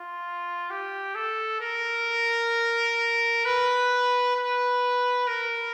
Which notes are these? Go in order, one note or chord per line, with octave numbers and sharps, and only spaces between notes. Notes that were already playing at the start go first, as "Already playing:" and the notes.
Already playing: F4
G4
A4
A#4
B4
B4
A#4